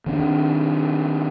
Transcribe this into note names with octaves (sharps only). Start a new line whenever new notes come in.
D#3 C4 D4